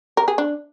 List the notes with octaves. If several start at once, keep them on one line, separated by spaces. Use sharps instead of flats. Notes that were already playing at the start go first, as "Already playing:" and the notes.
A#4
G#4
D4